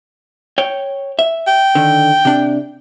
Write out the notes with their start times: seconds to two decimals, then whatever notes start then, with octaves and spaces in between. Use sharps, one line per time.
0.58 C#5 G5
1.19 E5
1.47 G5
1.75 D3 D#3
2.25 C3 D4